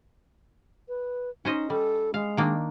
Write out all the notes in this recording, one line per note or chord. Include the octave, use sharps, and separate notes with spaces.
B4
C#4 D#4 C5 D#5
G3 A4
G#3 F5
D#3 A#3 D4